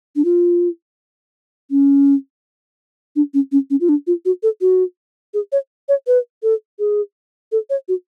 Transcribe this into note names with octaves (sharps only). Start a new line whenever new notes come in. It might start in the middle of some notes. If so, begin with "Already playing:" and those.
D4
F4
C#4
D4
C#4
C#4
C#4
F4
D4
F4
F#4
A4
F#4
G#4
C#5
C#5
B4
A4
G#4
A4
C#5
F#4